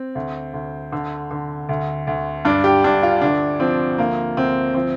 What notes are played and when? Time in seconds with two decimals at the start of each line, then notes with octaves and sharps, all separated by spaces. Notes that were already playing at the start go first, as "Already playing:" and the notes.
Already playing: C4
0.15 D2
0.54 D2
0.92 D3
1.31 D3
1.69 D2
2.07 D2
2.45 G2 D4
2.64 G4
2.84 G2 D4
3.03 F4
3.21 D2 D4
3.60 F3 C4
3.98 D2 A#3
4.37 D2 C4
4.75 F3 C4